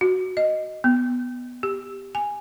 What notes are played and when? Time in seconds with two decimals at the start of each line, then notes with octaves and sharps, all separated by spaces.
0.01 F#4
0.37 D#5
0.84 B3
1.63 G4
2.15 G#5